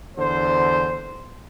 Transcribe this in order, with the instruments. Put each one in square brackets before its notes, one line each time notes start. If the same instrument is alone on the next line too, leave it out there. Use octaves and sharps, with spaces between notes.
[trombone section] E2 D3 C5